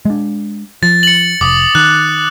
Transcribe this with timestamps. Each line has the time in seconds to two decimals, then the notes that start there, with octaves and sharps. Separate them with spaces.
0.05 G#3 D4
0.83 F3 A6
1.03 C#7 F#7
1.41 F1 D6 D#6
1.75 D#3 F#6